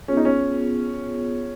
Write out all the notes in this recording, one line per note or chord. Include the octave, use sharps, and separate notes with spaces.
B3 C#4 F4 G#4
D#4
C#4